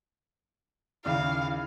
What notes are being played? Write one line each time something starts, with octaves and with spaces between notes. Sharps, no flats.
D#2 C#3 E4 D5 F5